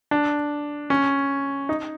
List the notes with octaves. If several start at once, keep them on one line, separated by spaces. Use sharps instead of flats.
D4
C#4
D#4